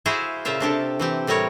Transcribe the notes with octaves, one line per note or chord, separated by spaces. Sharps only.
E4 F#4 G#4 C5 E5 F5
A#2 C#3 F4 C5 E5 F5
C3 D4 G4 A4
E3 C4 G4
A2 G3 C4 A#4 C#5